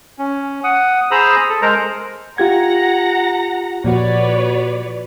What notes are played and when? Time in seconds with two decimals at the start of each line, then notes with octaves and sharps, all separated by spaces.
0.19 C#4
0.64 F#5 D#6
1.11 G#4 C5 A#5 B5 D#6 E6
1.49 A4
1.62 G#3 A#4 C5 A#5
2.38 F4 G4 F#5 A#5 G#6 A#6
3.84 A#2 F3 F#4 B4 C#5 D5